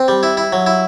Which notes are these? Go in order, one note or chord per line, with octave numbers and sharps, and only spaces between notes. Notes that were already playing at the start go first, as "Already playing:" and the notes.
Already playing: C4
G3
E4
E4
F#3
E4